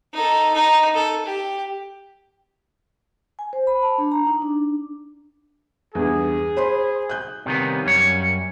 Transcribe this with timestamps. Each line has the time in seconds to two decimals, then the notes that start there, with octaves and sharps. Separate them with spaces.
0.13 D#4 A4
0.54 D#4
0.94 A4
1.26 G4
3.39 G#5
3.53 C5
3.67 B5
3.82 A5
3.98 D4
4.12 A#5
4.27 D#4
4.42 D4
5.95 E2 G2 G#4
6.56 C5 B5 C6
7.09 F#6 G6
7.46 C3 D#3 G3 A#3 B3 C#4
7.86 F#2 C#5